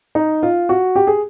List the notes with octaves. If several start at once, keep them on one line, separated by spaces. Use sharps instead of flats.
D#4
F4
F#4
G4
G#4